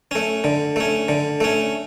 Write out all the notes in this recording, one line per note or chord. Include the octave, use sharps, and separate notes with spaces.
A3 C#4
D3
A3 C#4
D3
A3 C#4